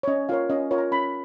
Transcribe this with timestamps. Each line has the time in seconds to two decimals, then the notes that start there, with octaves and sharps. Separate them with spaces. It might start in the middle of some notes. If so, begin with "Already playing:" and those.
0.03 C#5
0.08 C#4 D#5
0.29 F4 A#4 C#5 F5
0.50 C#4 D#5
0.71 F4 A#4 C#5
0.78 A#5
0.92 C#4 B5